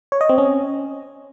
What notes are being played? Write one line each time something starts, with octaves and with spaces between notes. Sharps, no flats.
C#5
D#5
C4
C#4